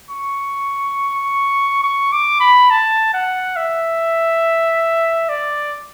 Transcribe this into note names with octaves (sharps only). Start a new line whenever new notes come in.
C#6
C#6
D6
B5
A5
F#5
E5
D5